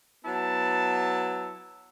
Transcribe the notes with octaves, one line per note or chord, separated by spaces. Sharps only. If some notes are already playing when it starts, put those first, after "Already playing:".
F#3 B3 E4 A5